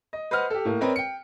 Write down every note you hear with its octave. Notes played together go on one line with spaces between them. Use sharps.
D#5
B4 C5 D#5 F#5 F6
G4 A4
A2 A#3
C4 A#4 B4 C#5 D#5
G5 C#7